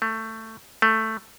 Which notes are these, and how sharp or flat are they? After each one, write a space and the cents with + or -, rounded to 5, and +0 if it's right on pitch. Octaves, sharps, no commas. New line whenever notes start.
A3 +15
A3 +5